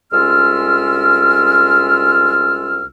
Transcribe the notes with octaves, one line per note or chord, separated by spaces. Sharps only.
C2 G#3 C#4 F4 E6 F6